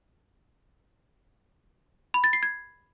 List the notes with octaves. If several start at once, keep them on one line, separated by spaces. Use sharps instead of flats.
B5
A6
C7
G#6